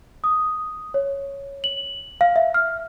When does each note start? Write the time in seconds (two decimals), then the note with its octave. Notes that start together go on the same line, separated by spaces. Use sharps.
0.24 D#6
0.94 C#5
1.64 F#7
2.21 F5
2.36 E5
2.54 F6